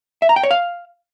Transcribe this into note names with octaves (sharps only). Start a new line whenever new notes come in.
E5
A#5
G5
C#5
F5